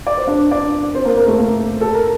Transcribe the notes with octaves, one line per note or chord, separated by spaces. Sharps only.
D5
C5
D4 D5
D4 D5
C4 C5
A#3 A#4
A#3 A#4
A3 A4
A#3 A#4
A4
A#4